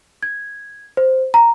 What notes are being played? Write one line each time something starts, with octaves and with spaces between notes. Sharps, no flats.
G#6
C5
A#5